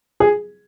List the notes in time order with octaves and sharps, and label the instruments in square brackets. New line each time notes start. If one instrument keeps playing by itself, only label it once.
[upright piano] G#4